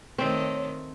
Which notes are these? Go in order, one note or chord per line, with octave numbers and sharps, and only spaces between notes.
D#3 A3 C4 C#5